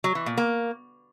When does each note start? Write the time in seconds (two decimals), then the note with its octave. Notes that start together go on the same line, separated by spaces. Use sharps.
0.04 F#3
0.15 E3
0.26 A#2
0.37 A#3